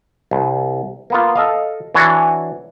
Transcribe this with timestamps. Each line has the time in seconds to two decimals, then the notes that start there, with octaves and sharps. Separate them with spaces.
0.31 C2
1.10 A#3 B3 F4
1.36 A4 D#5 F5
1.95 E3 D4 F#4 C#5